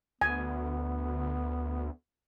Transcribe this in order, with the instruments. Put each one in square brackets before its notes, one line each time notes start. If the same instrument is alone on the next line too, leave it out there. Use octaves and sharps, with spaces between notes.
[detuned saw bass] D2 [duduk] B3 [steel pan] G#5